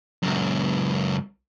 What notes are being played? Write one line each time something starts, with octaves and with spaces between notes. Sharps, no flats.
C#2 F#2